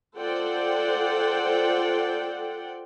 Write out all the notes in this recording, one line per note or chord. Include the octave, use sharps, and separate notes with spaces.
F4 A4 C5 D5 F#5 G5